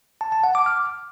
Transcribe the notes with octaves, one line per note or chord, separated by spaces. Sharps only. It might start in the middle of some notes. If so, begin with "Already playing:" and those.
A5
A5
F#5
D6
F6